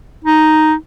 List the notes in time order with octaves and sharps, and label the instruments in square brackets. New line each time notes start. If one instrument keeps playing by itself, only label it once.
[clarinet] D#4